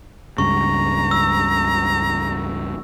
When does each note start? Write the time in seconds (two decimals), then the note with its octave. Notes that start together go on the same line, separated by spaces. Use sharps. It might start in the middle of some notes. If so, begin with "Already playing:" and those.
0.38 C#2 G2 C#3 A#5 C#6
1.11 E6